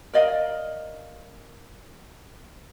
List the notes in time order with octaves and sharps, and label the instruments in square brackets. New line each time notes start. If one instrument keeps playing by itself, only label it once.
[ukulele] A#4 D5 D#5 F5